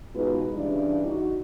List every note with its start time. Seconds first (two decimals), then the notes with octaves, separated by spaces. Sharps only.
0.15 B2 G#3 D#4 F4 B4
0.55 G2 C#3 E3 D4 F4 D5
1.07 D#4 F#4